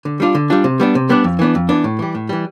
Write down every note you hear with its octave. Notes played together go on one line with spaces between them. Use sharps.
D3
G3 D4 F4
D3
G3 D4 F4
C3
G3 B3 D4
C3
G3 B3 D4
F2
E3 B3 D4
F2
E3 B3 D4
A2
E3 G3
A2
E3 G3